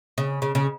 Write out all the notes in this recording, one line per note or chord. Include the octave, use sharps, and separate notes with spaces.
C#3
C#3
C#3